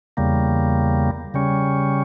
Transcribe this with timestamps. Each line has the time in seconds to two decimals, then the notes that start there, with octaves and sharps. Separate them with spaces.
0.17 E2 C#3 G3 A#3
1.34 C#3 G3 C#4